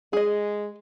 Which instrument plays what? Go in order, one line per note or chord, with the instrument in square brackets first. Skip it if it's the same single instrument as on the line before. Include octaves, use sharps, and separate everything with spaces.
[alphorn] G#3 [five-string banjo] G#4 D#5